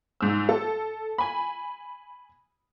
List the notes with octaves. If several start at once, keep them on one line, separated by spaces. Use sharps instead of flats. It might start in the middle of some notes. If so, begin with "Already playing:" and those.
G#2 E6
A4
G#5 B5